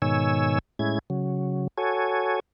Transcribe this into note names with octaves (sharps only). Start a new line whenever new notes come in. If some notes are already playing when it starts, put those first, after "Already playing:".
G#2 B2 D#3 C#5 G#5 E6
A2 G#3 C#4 E4 G#6
C#3 F#3
F#4 A4 C#5 G#5